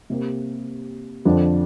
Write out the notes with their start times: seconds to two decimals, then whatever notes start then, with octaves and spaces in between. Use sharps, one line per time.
0.10 C3 A#3 G4
1.25 F2 D3 F3 D4